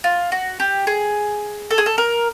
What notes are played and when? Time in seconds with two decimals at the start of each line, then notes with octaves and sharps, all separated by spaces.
0.04 F4
0.32 F#4
0.60 G4
0.87 G#4
1.71 A4
1.78 G#4
1.86 A4
1.98 A#4